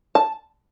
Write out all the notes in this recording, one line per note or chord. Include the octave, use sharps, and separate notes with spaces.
A5